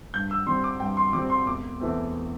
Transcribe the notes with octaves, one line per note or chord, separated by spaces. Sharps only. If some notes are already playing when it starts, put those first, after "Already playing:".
G2 G6
E6
G3 C4 C6
D6
G2 G5
C6
G3 C4 D6
C6
E1 D6
E2 E3 A3 C4